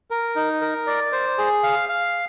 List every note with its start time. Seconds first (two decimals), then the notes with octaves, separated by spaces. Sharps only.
0.11 A#4
0.36 D#4
0.61 A#4
0.87 D5
1.12 C5
1.38 G#4
1.63 F5
1.89 F5